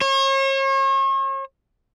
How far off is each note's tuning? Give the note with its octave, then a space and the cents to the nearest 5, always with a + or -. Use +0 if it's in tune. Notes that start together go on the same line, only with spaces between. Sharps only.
C#5 -40